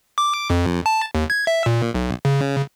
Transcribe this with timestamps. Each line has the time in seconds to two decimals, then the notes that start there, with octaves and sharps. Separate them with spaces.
0.18 D6
0.50 F2
0.86 A5
1.15 D#2
1.30 G#6
1.47 E5
1.66 A#2
1.94 B1
2.25 C#3